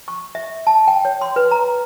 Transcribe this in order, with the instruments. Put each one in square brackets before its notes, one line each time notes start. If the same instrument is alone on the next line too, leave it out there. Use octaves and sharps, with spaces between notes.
[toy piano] C#6
E5
A5
G5
C#5
C6
B4
A#5